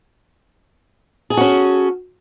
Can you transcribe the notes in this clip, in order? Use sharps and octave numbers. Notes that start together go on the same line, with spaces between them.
C#4 F#4 G#4 A4